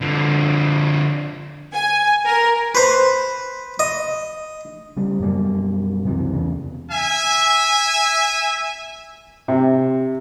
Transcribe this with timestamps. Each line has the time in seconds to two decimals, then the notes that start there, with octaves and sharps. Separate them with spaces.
0.01 D3 F3
1.73 G#5
2.25 A#4
2.75 B4 C5
3.79 D#5
4.97 C#3 G3
5.20 F#2 B2 G3 A#3
6.04 C#2 F#2 C3 E3
6.32 E2 C#3
6.90 E5 G#5
9.48 C3